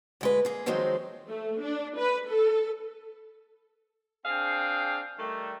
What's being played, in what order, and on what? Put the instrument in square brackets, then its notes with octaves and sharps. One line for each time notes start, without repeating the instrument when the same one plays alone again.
[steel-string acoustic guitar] D2 G#3 B4
A#3 G#4
D#3 F3 F#3 G#3 C4 D#4
[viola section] A3
D4
B4
A4
[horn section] C4 D4 G#4 F5 G5
D#3 G3 A3